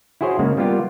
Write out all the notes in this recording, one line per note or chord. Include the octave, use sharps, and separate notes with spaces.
E4 F#4 G#4 C5 C#5
C#3 G#3 A#3
G3 A#3 B3 F4 G4